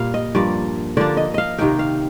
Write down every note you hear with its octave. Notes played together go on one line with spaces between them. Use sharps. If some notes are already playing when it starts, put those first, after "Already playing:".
Already playing: A#2 G3 A#3 F5
D#5
G2 F3 A#3 D5
D3 F3 A#3 D4 D5
D#5
D#5 F5
C3 D#3 A#3 D#4 G5
F5